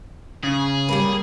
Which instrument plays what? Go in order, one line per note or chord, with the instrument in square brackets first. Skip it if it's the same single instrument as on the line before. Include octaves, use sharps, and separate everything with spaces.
[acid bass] C#3 [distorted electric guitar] G#4
[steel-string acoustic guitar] G3 A#3 A#4 [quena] B5